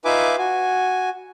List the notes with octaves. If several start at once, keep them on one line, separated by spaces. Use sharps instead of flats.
D#4 F4 B4 E5 G#5 D6
F#4 G#5